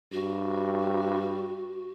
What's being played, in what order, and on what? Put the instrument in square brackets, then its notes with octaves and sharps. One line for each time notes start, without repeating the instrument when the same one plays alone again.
[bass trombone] G2 [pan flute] F#4